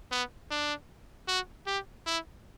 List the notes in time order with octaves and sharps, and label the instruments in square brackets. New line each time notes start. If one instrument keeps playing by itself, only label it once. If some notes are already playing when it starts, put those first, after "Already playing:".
[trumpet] B3
D4
F#4
G4
E4